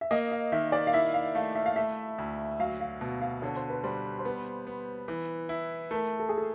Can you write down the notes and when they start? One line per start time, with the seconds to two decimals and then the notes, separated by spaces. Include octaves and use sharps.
0.01 E5
0.11 A#3 D#5
0.32 F5
0.52 D#3 E5
0.72 D5
0.87 F5
0.93 E4 E5
1.14 F5
1.35 A3 F5
1.55 E5
1.66 F5
1.76 A3 E5
2.18 D2
2.60 F#3 F5
2.81 F5
3.01 B2
3.21 F5
3.42 D3 C#5
3.56 C5
3.70 B4
3.84 G3 C5
4.19 C5
4.25 B3 B4
4.67 B3
5.08 E3
5.49 E4
5.91 A3 A#4
6.19 A4
6.29 G#4
6.38 A4